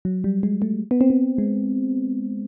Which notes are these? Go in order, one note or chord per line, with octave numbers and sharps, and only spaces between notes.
F#3
G3
G#3
A3
B3
C4
B3
G#3